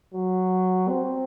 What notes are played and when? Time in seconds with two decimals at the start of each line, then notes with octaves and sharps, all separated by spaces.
0.14 F#3
0.89 C4